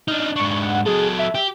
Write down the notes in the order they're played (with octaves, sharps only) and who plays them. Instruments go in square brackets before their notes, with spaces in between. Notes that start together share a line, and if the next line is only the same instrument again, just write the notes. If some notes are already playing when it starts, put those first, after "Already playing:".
[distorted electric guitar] D4 D#4 [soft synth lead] F6
[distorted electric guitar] G#2 D4 [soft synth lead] C#6
[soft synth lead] F#5
[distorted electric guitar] F#3 A4 [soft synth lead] G#4
[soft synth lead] E5
[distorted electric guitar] G4